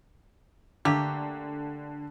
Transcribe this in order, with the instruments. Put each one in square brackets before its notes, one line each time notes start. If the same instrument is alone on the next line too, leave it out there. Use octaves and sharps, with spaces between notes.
[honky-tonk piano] D3 [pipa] A3 A#3 G4